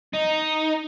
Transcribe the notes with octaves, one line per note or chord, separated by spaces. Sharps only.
D#4